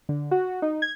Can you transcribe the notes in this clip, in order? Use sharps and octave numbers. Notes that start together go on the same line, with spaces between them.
D3
F#4
D#4
G#6